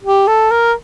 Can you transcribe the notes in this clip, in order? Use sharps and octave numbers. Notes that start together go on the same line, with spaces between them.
G4
A4
A#4